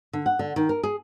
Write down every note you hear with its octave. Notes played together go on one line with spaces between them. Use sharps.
D3
F#5
D3
D#3
A#4
G#4